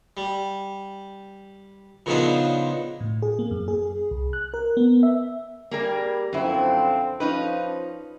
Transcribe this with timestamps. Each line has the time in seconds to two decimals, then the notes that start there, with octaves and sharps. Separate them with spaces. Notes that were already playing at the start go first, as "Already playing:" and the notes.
0.17 G3
2.06 A#2 C#3 F3 B3 D4 D#4
3.01 A2
3.22 G#4
3.39 A#3
3.51 F#2
3.68 G#4
4.11 C2
4.33 F#6
4.54 A#4
4.77 B3
5.03 E5
5.71 G3 A#3 G#4 A#4
6.33 F#2 D3 F3 C4 E4
7.20 F3 C#4 D#4 B4